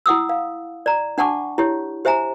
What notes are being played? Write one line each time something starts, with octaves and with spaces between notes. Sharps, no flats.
E4 F#5 D#6 E6
F5
D5 A#5
D4 F#5 A5 C#6 D6
E4 G4 C#5
G4 C5 E5 G#5 A#5